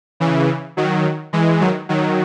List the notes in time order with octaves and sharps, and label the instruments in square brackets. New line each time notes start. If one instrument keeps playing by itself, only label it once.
[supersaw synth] C#3 E3
D#3 F#3
E3 G#3
D#3 F#3
D#3 F#3